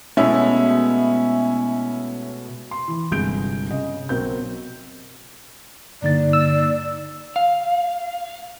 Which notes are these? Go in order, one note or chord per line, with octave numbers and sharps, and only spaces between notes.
B2 G#3 A3 C#4 E4 E5
C6
E3
G1 C2 G#3 G6 D7
C#3 D#5
B1 F#3 C4 A#4 G6
G2 D3 A#3 D#4 D5 A6
E6
F5